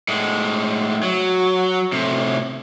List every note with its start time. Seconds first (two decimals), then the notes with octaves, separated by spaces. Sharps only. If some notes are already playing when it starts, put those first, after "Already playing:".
0.08 A2 G#3
1.03 F#3
1.92 A2 C3